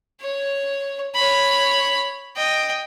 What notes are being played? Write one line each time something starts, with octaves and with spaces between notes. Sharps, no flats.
C#5
C#5 B5
D#5 G5